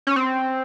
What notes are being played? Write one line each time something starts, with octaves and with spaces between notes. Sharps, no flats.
C#4
C4